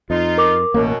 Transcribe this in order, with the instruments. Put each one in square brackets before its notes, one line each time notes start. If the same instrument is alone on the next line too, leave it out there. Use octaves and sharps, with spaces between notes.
[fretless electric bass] F2 [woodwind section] D#4 F4
[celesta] A#4 D6
[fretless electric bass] A1 A#3 [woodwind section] F#2 B2